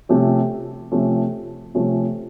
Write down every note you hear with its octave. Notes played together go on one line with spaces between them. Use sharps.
C3 F3 A3 C#4
C3 F3 A3 C#4
C3 F3 A3 C#4